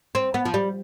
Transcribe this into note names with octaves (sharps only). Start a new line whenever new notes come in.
C4
B3
F3
G3